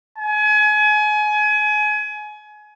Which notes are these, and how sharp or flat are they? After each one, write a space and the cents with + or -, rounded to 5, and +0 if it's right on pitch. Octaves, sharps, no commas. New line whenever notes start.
G#5 +30